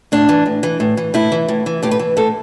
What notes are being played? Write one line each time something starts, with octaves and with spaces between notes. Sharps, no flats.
A2 D4
E3
A2
E3
A2
E3
A2 E4
E3
A2
E3
A2 G4
B4
E3
A2 A4